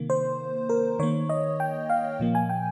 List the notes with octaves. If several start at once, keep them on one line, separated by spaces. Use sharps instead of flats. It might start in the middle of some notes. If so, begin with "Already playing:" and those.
Already playing: C3 D#3 A#3
C5
A#4
D#3 A#3 C#5
D#5
G5
F5
A#2 F3 A#3
G#5
G5